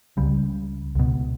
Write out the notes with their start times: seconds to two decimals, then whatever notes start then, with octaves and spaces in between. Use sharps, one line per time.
0.17 C#2 C#3 G3
0.95 C#2 B2